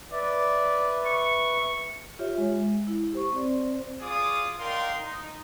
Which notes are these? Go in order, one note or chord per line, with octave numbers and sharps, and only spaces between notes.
B4 D5 E5
C#6
F4 G4 C#5 E5
G#3
E4
G4 C5 C#6
C4 C5 D5
F4 G#4 D5 D6 D#6
D#4 A#4 D5 F5 G5 C6
D#4